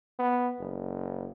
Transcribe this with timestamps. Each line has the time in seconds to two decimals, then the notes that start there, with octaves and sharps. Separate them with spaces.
0.19 B3
0.60 F#1